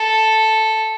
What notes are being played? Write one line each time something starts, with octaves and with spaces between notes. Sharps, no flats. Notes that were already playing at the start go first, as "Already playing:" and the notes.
Already playing: A4